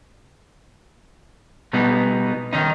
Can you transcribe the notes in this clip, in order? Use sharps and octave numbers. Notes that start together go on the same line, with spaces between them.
B2 G3 B3 D#4
D#3 C#4 D#4